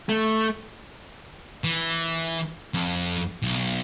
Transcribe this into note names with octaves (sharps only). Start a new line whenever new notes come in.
A3
E3
F2
B1